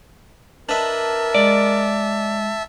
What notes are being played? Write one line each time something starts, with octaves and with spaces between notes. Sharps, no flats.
D4 A#4 B4 D#5 E5 A5
G#3 D5